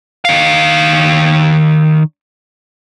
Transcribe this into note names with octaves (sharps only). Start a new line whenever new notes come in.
D#3 F5